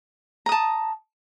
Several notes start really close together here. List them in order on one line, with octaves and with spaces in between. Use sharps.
A#5 D#6 A5